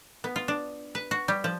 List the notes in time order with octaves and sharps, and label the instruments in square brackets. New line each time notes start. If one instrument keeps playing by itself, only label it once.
[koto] B3
F4
D4
B4
F#4
G3
F3